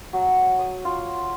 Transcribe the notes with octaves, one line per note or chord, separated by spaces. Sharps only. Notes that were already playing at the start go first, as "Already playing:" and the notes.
F#3
D#6
F4